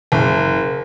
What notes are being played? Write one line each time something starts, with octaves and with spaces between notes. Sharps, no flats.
F#1